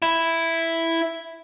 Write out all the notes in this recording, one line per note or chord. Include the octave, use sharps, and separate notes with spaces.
E4